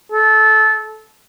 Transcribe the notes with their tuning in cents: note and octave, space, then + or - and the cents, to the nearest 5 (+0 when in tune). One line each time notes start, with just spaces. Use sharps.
A4 -20